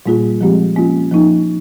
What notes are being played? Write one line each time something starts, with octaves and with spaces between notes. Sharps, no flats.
A#2 G3 A#3 F4 G#4
F3 G#3 C4 G4
F3 A#3 C#4 F4
F3 A#3 D#4